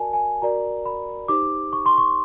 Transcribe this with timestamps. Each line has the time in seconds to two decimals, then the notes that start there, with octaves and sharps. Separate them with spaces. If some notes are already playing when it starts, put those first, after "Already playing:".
Already playing: F#4 A#4 D5 G#5 A5
0.13 G#5
0.42 F#4 A#4 D5 A#5
0.86 B5
1.28 D#4 G4 C5 D6
1.73 C#6
1.86 C6
1.98 C#6